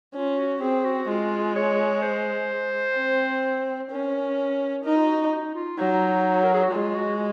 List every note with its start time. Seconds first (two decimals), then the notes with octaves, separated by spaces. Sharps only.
0.14 C#4 F4
0.38 F#4
0.62 C4 G#4
0.85 F#4
1.09 G#3 F4
1.56 C#5
2.02 C5
2.96 C4
3.90 C#4 A#4
4.84 D#4 A#4
4.96 F4
5.08 F#4
5.32 D#4
5.55 F4
5.78 F#3 D#4
6.45 A#4
6.54 G#4
6.63 F#4
6.72 G#3 F4
6.95 F#4